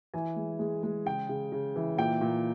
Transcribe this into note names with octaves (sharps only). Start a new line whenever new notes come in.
E3 G#5
G#3
G#3
G#3
C#3 G5
C#3
C#3
E3
A#2 G5
A#2